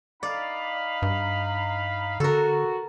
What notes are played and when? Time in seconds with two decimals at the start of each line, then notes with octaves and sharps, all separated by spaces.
0.23 D#4 D5 F5 B5
1.02 G2
2.20 D3 F#4 A4 A#4